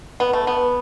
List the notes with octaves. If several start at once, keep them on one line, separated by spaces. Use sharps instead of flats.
B3
A3
B3